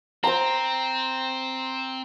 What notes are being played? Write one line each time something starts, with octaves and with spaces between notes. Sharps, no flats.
C4 C5 A#5